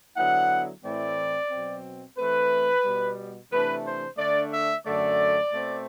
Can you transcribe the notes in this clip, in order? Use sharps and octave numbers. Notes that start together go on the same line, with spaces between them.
D3 F#3 B3 E4 F#5
A2 E3 A3 C4 E4 D5
B2 F#3 C4
E3 A3 C4 B4
B2 G3 B3
C3 E3 A3 D4 B4
C5
D3 A3 D4 D5
E5
F#2 D3 A3 D5
B2 A3 C4